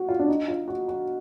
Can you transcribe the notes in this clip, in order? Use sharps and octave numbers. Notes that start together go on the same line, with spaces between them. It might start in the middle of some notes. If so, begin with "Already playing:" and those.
Already playing: F#4
F4
D4
D#4
F4
F#4
F#4